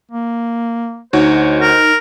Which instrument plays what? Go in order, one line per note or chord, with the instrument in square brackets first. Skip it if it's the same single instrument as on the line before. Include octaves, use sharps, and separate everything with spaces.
[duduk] A#3
[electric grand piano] D2 F#4 C#5 [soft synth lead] D#4 [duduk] C5
[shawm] A#4